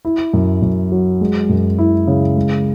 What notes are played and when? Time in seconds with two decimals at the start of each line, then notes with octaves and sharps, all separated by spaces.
0.05 E4
0.33 F#2
0.62 F#2
0.92 F#3
1.21 G#3
1.49 F#2
1.79 E4
2.07 C#3
2.36 G#3